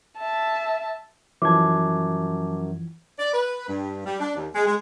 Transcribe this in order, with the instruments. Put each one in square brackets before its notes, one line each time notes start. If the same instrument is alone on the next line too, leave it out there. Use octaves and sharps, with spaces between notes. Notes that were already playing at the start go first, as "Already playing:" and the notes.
[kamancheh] E5 A5
[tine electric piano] F#2 [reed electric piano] E3 F3 G#6 [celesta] A5 D6
[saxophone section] D5
B4
G2
G3
D4
D#2
G#3
G#3